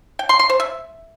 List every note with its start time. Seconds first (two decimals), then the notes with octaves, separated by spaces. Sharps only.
0.19 G5
0.29 C6
0.39 C6
0.50 C5
0.60 E5